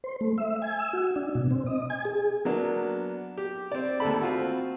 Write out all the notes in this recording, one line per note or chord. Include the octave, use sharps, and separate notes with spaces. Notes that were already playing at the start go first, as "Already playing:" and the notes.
C5
A3
E5
G#5
E6
F#4
D4
B2
C4
D#5
G#5
G#4
F#3 A#3 B3 D4
G4
C4 D5
D#2 A3 A4 B5
C4 F4 F#4